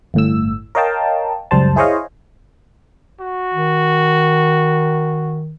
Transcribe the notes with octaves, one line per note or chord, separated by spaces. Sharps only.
G1 A2 E6
A#4 C#5 D#5 F5 G5 A5
C#2 F#2 G3 C5 A5
E4 G#4 C5 C#5 D#5 F5
F#4
D#3